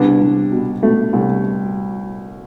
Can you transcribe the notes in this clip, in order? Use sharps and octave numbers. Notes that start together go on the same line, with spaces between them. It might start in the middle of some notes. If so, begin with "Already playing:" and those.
Already playing: C2 B3 D4
C2
B2
B2 A3
C2